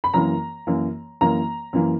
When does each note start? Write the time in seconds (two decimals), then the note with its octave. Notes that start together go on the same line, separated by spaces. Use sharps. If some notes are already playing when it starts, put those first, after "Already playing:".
0.04 B5
0.14 F#2 E3 A#3 A#5
0.67 F#2 E3 A#3
1.21 F#2 E3 A#3 A#5
1.73 F#2 E3 A#3